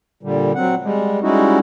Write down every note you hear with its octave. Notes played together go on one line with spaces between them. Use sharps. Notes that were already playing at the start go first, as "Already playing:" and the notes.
A#2 D3 G3
F#3 C4 F#5
G3 G#3
G3 G#3 C#4 D#4 E4 F#4